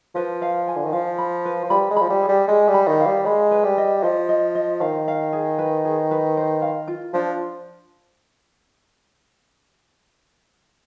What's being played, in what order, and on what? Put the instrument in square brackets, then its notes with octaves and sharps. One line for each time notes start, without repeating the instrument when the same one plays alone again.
[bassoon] F3 [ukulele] B4
[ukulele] F5
G#5
[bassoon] D3
D#3
[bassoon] F3 [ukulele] F5
[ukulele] B5
B4
[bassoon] F3
[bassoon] G3 [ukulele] B5
[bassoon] G#3
[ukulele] B5
[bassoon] F3
G3
[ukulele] G#4
[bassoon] G3
[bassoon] G#3 [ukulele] G#4
[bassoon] G3
[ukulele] B5
[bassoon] D#3
[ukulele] F5
[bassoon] G3
[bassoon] G#3 [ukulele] B5
[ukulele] B4
[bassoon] G3
[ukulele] D#5
[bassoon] F3 [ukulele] D#5
[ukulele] D#5
D#5
[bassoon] D#3 [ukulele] F5
[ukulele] F5
G#4
B4
G#4
B4
C5
F5
F4
[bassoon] F3 [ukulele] D4